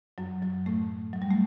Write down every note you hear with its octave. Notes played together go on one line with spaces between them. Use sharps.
F#2 F#3
F#2 F#3
A2 A3
F#3
G3
A3